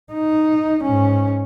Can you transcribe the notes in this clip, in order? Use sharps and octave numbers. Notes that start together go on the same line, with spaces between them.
D#4
G#2 C#4